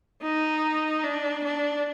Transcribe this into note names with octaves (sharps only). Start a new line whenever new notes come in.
D#4
D4
D4